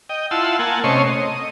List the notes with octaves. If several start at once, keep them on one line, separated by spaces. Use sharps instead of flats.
D#5 G5
E4 F4 F#5 A5 C6 E6
A#3 F#5 G#5 A5
C3 A3 C#4 C#5 D#5 C6
D#5